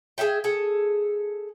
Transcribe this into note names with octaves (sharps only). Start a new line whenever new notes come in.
G#4 B4 E5 G5
G#4 A4